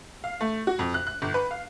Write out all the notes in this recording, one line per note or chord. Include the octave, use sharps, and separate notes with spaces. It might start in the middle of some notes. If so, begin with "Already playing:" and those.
F5
A3
F#4
F2
F#6
F#6
G1
B4
F5